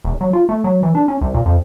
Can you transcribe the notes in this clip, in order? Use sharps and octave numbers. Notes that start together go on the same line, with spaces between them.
E1
F#3
F4
A3
F#3
E3
D4
C#4
C2
A#2
F2